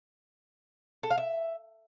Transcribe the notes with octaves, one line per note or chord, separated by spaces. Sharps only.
A4
F5
E5